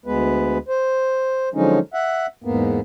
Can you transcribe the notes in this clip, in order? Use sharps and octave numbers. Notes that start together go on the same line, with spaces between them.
D2 G#3 B3 B4
C5
D3 F3 F#3 G#3 C#4 D#4
E5 F#5
E2 G#2 A#3 B3